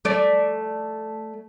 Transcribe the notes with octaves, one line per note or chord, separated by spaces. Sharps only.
A3 D5